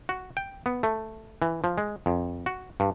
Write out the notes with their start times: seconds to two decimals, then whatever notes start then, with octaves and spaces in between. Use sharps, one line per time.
0.09 F#4
0.37 G5
0.66 B3
0.83 A3
1.42 E3
1.64 F3
1.78 G#3
2.06 F2
2.46 F#4
2.80 G2